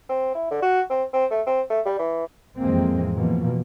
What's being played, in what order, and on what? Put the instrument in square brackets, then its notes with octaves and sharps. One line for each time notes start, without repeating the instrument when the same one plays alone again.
[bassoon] C4
E4
D3
F#4
C4
C4
A3
C4
A3
G3
E3
[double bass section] F2 A2 E3 G#3 A#3 C4
B2 E3 F3 A#3